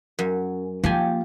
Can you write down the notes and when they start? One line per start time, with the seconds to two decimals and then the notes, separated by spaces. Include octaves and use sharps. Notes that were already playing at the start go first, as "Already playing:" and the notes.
0.19 F#2
0.84 F3 A#3 G4 G#5